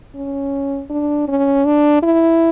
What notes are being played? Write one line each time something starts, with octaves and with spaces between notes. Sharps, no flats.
C#4
D4
C#4
D4
E4